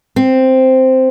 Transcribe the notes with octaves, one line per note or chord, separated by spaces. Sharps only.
C4